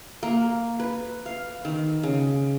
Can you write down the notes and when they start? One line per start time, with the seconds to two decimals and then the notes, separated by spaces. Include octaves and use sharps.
0.23 A#3
0.80 B4
1.26 F5
1.65 D#3
2.03 C#3